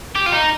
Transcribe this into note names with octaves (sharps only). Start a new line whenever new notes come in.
G4
F4
D#4